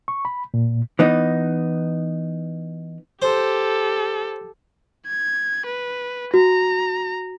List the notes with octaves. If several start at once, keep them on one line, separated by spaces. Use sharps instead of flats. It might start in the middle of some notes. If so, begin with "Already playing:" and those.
C#6
B5
A#2
E3 B3 D#4
G4 A4 C5
G#6
B4
F#4 A#5